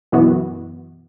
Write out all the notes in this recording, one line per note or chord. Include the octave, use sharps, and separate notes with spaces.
F#2 B2 E3 B3 F#4